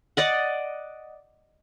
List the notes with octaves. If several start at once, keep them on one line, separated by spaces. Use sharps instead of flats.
D5 D#5 F#5